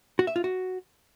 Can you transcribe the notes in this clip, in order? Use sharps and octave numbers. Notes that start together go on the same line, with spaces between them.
F#4
E5
F4
F#4